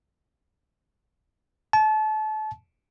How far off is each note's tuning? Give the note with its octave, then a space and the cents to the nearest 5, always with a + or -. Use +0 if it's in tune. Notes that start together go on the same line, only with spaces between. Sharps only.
A5 -30